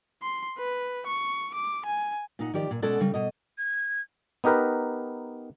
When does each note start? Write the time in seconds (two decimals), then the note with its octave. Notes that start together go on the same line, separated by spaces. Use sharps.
0.22 C6
0.58 B4
1.07 C#6
1.54 D6
1.86 G#5
2.39 A#2 D#4 F#5
2.54 D#3 F3 G4 D5
2.71 A#2
2.82 B2 G#3 C#4 A4 D5 F#5
3.01 C#3 G3
3.14 B2 D#5
3.58 G#6
4.44 B3 D#4 G4 A#4 B4